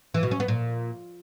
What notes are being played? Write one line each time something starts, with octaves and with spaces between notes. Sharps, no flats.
E3
B2
C#4
B3
A#2